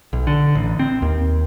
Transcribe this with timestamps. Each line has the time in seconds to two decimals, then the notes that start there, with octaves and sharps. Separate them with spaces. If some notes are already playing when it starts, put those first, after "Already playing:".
0.13 B1
0.27 D3
0.55 A1
0.79 C4
1.02 D#2